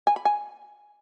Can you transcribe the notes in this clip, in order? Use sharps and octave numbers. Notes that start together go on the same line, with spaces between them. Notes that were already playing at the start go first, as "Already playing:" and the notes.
G#5
B5
G#5